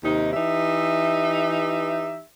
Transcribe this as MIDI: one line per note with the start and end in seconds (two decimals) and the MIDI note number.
0.04 0.31 39
0.04 0.31 48
0.04 0.31 63
0.33 2.22 52
0.33 2.22 63
0.33 2.22 67
0.33 2.22 76